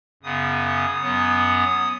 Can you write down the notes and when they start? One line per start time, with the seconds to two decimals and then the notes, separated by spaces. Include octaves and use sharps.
0.23 F#2 C#3 B3 D#6
1.02 F#2 F#3 B3